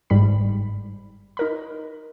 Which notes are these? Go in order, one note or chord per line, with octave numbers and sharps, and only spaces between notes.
G1 G#2 G3 B5
D#4 A#4 B5